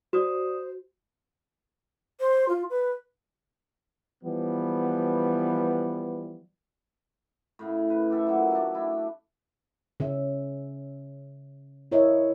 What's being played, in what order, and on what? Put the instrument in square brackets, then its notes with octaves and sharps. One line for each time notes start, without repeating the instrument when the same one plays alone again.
[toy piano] F#4 [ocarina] C5 [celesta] D5 D#6 E7
[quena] C5
F4
B4
[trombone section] E3 F3 G3 B3
[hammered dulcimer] A2 C#3
B4
G4 A4 E5
A#2 F#3
A3 D4
D4 E4
[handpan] C#3 C#4 E5
E4 A#4 C#5 D#5 E5